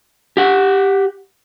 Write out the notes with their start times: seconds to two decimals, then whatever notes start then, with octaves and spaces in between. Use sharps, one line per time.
0.37 G4 F#5